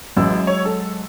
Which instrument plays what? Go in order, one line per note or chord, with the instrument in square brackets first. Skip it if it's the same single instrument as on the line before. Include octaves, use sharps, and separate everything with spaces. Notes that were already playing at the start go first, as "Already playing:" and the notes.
[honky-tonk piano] A1 [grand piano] F#3 G#3 E6
[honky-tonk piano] C#5
A4